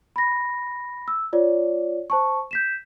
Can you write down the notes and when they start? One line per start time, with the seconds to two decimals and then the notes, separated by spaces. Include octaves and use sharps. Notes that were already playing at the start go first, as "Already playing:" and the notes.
0.16 B5 A#6
1.08 E6
1.33 F4 C#5 D5
2.10 C5 A5 C#6
2.51 G6 B6 E7